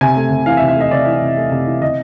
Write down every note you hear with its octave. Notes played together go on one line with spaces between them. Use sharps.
C3 G#5
A3
C3
E3 F5
E5
C3
E5
A3 D#5
C3 D5
E3
C3
A3
C3
E3
C3 D#5